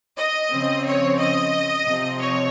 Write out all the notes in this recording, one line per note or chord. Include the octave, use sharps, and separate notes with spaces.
D#5
C#3 F3 C4
C#5
D#5
C3 F3 C4
C#5